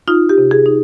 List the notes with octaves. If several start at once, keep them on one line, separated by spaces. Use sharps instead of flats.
D#4 F4
G4
C3
G#4
D#4